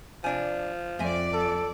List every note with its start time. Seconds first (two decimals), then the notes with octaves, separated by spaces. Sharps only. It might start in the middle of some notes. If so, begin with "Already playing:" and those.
0.24 C3 F3 D4 G#5
0.99 F2 C4 D5 E5 G#5
1.33 A4